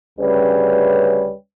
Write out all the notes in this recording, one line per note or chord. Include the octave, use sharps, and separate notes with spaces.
D2 C#3 G3 C#4 B4